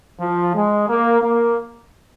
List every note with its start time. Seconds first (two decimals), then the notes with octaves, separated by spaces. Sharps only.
0.20 F3
0.55 G#3
0.89 A#3
1.22 A#3